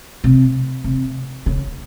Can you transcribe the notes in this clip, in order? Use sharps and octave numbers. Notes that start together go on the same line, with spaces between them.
C3
C3
C#3